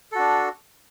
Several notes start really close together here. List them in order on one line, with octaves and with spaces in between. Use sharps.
A4 F#4 D4